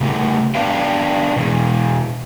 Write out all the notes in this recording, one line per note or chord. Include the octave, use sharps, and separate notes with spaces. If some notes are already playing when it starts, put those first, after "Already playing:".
C#3 A3 G4
B3 D4 B4 F5 G5
B2 E3